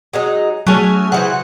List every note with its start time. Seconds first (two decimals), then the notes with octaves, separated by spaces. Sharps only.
0.13 F#3 G#3 D#4
0.67 F#3 A3 C#4 G#4
1.12 C#3 E3 C5 F#5